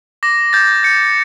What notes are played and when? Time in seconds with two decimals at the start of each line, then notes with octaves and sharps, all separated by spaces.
0.23 D6 A#6
0.53 G6 A6
0.83 G6 C#7